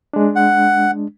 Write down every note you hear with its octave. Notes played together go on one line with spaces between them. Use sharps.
G#3 D4
F#5